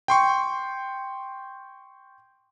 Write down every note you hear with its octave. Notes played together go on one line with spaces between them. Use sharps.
G5 C6 C#6